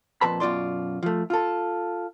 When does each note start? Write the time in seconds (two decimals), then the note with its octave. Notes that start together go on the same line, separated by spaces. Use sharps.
0.21 F2 A#2 B4 A5 B5
0.40 F#2 B2 F4 D5 C6
1.03 F3 A3
1.30 F4 A4